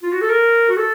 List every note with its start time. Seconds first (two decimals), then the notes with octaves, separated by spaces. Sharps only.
0.03 F4
0.13 F#4
0.21 A4
0.30 A#4
0.69 F#4
0.77 A4